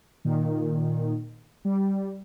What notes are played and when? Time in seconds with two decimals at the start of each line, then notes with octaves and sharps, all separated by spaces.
0.25 A#2 D#3
1.65 G3